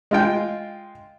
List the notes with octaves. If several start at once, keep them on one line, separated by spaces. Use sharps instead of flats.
G#3 F4 G5